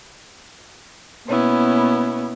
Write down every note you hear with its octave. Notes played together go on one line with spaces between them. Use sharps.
B2 A#3 B3 C#4 E4